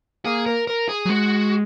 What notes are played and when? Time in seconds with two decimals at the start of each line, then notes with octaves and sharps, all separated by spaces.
0.25 A#3 G#4
0.46 A#4
0.67 A#4
0.89 G#4
1.05 F#3
1.09 G#3 F#4